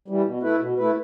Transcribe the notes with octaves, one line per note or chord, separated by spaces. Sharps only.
E3 G3
B2
A3 E4 B4
B2
A3 E4 B4